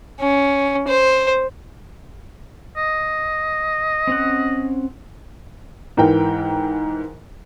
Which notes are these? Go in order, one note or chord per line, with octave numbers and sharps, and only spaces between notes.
C#4
C5
D#5
C4 C#4 F#5
G#2 E3 A#4 G5